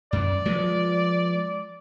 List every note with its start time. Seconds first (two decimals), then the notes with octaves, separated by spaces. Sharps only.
0.13 F#2 D5
0.45 F3 G#3 B3